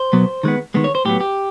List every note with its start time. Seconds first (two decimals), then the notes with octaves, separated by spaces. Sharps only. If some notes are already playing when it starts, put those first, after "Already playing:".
Already playing: C5
0.13 B2 F#3 B3
0.43 D#3 G#3 B3
0.74 D#3 G#3 B3
0.84 C#5
0.95 C5
1.05 A2 F#3 B3 G4
1.21 G4